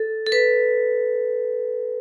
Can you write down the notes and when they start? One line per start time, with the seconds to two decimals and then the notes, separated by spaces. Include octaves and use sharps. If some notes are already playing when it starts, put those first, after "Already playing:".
Already playing: A4
0.26 A4
0.32 B4